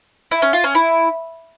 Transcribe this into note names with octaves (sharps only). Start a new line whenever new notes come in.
E4
C#4
F4
C#4
E4